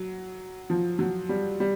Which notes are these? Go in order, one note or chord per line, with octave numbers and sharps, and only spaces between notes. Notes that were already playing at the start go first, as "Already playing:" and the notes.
Already playing: F#3
F3
F#3
G3
G3